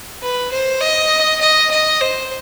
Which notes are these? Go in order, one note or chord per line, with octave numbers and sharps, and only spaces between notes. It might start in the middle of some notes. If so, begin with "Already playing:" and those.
B4
C5
D#5
D#5
D#5
C5